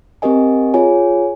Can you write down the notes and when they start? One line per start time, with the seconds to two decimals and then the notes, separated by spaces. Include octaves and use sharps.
0.22 C4 G4 A#4 D#5 G#5
0.74 F4 G#4 C#5 G#5